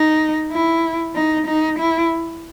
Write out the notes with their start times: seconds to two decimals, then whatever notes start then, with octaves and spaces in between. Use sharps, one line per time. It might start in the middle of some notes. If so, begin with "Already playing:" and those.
Already playing: D#4
0.52 E4
1.15 D#4
1.47 D#4
1.79 E4